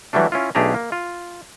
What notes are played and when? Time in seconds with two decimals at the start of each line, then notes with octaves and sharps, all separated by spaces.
0.13 E3 F#3 G3 A3 D4
0.32 C#4 E4 F4
0.55 B1 A3 D4 G4 G#4 A#5
0.74 A#3
0.92 F4